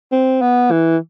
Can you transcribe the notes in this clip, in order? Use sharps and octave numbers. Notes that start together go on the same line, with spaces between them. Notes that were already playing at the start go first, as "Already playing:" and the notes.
C4
B3
E3